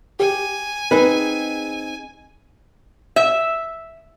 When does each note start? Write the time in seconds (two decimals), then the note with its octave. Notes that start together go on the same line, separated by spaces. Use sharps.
0.20 G4 G#5
0.91 C4 D#4 G#4 B4
3.16 E5